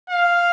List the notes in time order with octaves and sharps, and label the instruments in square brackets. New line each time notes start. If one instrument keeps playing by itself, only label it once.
[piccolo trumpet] F5